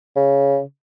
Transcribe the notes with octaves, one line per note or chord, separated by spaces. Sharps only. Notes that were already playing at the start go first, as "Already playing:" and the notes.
C#3